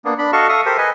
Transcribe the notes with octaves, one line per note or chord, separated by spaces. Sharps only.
A#3 B3 D4
D4 B5
F#4 A4 D#5 F5 A5 C#6
A4 E5 F5 C#6 D#6
G4 A4 A#4 C5
B4 D#5 G#5